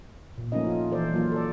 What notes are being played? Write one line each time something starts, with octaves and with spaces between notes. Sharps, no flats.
A#2
F3 A3 A#3 C#4 D#4 D#5
F4
E3 A4 C5 D5
F#3 A#3 F4
A4 D5